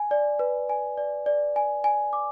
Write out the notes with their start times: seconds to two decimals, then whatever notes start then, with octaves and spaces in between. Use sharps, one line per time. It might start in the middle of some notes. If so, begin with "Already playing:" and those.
Already playing: G#5
0.11 D5
0.39 B4
0.69 G#5
0.97 D5
1.26 D5
1.56 G#5
1.84 G#5
2.13 D6